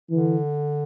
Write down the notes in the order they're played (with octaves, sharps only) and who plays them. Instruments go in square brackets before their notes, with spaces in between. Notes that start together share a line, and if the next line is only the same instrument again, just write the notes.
[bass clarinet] D3 [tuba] E3